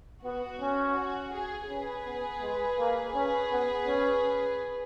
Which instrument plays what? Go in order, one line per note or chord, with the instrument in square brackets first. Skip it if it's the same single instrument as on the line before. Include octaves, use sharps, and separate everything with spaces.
[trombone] B3 [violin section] F#4
[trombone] C#4
[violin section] F#4
G#4
[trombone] C#4 [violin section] G#4 B4
[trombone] B3
G#3
A#3
[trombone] C#4 [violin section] G#4 B4
[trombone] B3
C#4